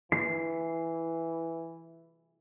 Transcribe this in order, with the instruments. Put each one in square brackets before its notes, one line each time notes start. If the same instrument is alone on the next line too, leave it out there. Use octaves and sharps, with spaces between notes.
[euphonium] E3 [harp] C7